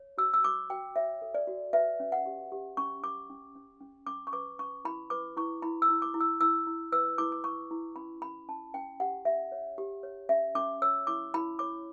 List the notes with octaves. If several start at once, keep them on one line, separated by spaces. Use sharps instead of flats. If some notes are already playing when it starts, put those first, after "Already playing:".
Already playing: C#5
F#4 E6
E6
F#4 D6
F#4 G5
C#5 E5
A4
D5
F#4
B4 E5
C#4
F#5
G4
G4
C#4 C#6
C#4 D6
C#4
C#4
C#4
C#4 D6
C#6
B4 D6
C#4 C#6
E4 B5
B4 D6
E4 C#6
E4 B5
E6
E4
D6
E4
E6
E4 E6
E4
B4 E6
E4 D6
D6
E4 C#6
E4
C#4 B5
C#4 B5
C#4 A5
C#4 G5
G4 F#5
G4 E5
C#5
G4
C#5
C#4 E5
C#4 D6
C#5 E6
E4 D6
E4 B5
C#5 D6